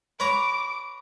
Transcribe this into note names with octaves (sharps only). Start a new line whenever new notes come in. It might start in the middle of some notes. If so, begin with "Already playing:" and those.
B4 C#5 A#5 D6